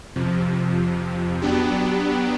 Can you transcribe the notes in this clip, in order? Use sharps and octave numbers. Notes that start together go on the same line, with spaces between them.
F2 C3 F3
F#3 B3 D4 G4